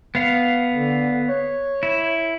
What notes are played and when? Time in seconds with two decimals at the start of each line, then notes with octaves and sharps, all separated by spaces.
0.15 B3 F5
0.71 D3
1.28 C#5
1.83 E4